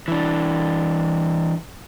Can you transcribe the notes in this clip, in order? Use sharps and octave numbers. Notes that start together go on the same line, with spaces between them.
E3 D4